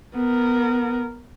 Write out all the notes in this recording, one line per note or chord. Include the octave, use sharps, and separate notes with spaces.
B3 A#4